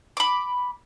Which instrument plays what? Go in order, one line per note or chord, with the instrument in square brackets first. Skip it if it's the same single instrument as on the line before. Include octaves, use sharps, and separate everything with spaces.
[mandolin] B5 D6